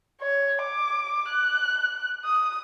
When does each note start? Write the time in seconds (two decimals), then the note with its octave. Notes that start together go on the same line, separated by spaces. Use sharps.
0.22 C#5
0.62 D6
1.30 F#6
2.24 D#6